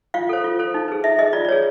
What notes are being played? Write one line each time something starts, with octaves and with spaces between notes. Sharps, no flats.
F4 F5
A4 C5
F4
A4 C5
D#4
G#4 B4
D#4 E5
G#4 B4 D#5
F4 D5
D5
G#4 B4 C#5